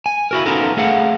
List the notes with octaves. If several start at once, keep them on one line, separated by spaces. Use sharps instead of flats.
G#5
E4 F#4 A#4
B3 C#4 D#4 F4 A4 A#4
A3 G#4 F5 F#5